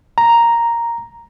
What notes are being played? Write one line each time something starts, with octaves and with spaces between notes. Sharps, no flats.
A#5